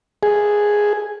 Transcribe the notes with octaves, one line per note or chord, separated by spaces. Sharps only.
G#4